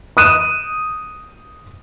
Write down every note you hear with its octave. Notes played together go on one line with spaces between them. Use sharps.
D#6 F#6 D#7 E7